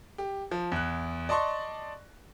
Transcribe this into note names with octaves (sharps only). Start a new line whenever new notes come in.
G4
F3
E2 F#6
D5 D#5 A5 C6 C#6